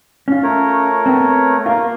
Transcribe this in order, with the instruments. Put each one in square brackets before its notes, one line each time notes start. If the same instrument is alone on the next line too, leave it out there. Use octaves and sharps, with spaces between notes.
[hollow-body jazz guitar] C#4 F4
[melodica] A3 A#4 C#5
[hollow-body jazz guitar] B3 C4
[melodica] A#3 [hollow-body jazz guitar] F4 A#4